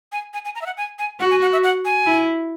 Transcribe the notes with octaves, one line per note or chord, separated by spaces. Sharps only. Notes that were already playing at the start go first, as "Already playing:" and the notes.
G#5
G#5
G#5
A#5
E5
F#5
G#5
G#5
F#4 F#5
G#5
F#5
E5
F#5
G#5
E4